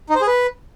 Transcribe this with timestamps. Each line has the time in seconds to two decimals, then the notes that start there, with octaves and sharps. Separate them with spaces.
0.10 D#4
0.15 C5
0.21 G#4
0.27 B4